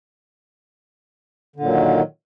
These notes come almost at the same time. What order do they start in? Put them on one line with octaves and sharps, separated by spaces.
D3 A#2 F#3 D#3